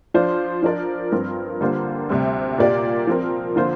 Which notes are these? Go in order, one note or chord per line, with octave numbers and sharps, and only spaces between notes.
F3 D4 F4 C5
F3 D4 A#4 D5
G2 F3 C4 A#4
D3 G3 A#3 F4 C5
D2 C3 G3 C4
A#2 A#3 G4 D5
F3 C4 A#4
D3 F3 A#3 F4 C5